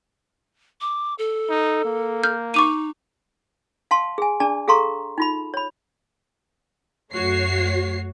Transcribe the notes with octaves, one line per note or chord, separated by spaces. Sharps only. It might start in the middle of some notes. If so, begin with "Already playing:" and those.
D6
A4
D#4
A#3
F6 G6
D#4 C#6 D6 D#7
F5 A5 C6
G#4 G#5
D4 G#4 D5 A5
G#4 A4 F5 A#5 C6 C#6
D#4 F4 B5
C#5 B5
F#2 A3 F#4 C#5 C7